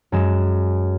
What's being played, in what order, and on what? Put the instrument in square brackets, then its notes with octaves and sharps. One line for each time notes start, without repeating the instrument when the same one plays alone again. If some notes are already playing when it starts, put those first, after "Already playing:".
[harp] F#2 G#3 E7